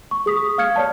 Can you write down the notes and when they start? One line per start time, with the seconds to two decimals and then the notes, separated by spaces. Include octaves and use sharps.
0.11 C#6
0.26 G#4 D#6 B6
0.58 F5 F6 G#6 C#7
0.76 C#5 D5 A5